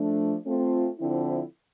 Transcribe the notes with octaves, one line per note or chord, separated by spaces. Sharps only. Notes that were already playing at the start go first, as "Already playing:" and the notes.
Already playing: F3 A3 D4
A3 C4 F4
D3 F3 C4 E4